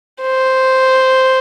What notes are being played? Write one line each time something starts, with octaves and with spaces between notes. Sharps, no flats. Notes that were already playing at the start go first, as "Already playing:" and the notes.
C5